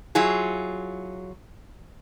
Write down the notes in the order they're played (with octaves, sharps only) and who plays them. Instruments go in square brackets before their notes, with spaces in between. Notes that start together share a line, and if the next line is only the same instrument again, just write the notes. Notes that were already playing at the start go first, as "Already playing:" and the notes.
[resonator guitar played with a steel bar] F#3 E4 F4 G#4